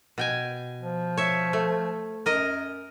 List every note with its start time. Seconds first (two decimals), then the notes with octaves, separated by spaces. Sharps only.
0.18 B2 G5 G#5
0.81 F3
1.17 C#5 E5
1.53 A3
2.26 F#2 A#4 D#5